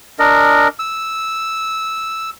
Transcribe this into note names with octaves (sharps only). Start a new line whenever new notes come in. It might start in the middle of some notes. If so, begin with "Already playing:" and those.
D4 A#4 D#5
E6